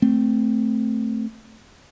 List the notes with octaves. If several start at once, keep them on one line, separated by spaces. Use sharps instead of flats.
A3 C4